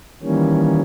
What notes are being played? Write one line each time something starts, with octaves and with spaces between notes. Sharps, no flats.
D#3 E3 G3 A#3 C#4